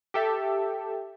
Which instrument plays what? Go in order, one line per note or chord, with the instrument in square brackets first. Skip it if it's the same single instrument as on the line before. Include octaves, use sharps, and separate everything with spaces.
[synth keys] G4 A4 E5